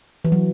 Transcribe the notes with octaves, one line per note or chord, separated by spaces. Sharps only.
E3
F#3